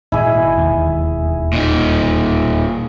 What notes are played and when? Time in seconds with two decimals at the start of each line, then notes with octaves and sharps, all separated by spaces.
0.12 G#1 A#2 E4 G#4
0.57 E1 D#2 D#3
1.53 A#2 D#4